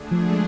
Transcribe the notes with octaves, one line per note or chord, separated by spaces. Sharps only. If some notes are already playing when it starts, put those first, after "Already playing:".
Already playing: D3 A3 D4 G#4
F3
G#3